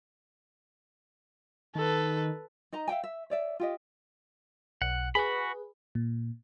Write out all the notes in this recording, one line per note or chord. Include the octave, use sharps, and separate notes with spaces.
D#3 A4 B4
D#4 D#5 A#5
E5 F5 G5 G#5
E5
C#5 D5 E5
F4 G4 D#5
B1 F#5
F#4 G#4 B4 B5
A#2